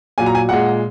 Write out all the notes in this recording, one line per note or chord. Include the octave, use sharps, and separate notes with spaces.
A#2 F#3 G#5
A#5
G#5
A#2 G#3 F#5